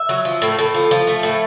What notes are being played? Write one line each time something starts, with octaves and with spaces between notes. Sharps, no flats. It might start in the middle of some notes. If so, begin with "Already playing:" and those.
Already playing: E5
F#3
F3
A2
A2
F3
F3
A3
A2